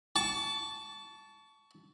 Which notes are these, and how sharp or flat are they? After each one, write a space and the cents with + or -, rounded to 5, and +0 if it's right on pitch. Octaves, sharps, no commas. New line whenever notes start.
A5 -10 C#6 +25